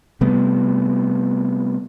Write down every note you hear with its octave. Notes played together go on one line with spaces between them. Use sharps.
C3 G3 A3 B3